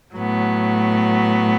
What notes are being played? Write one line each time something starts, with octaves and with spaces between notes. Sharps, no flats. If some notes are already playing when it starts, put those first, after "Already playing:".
A2 F#3 B3